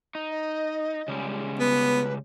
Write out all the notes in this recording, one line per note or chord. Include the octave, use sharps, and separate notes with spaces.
D#4
D#5
C#3 G3 G#3
B3 B4